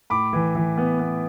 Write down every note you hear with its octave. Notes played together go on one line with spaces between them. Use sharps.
A2 B5 D6
E3
E3
B3
B3